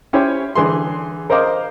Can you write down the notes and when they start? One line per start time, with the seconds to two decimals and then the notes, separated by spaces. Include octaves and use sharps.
0.13 C#4 E4 G4 C5 C#5
0.55 D3 E3 G#4 C6
1.30 A#4 C5 D#5 F5 D6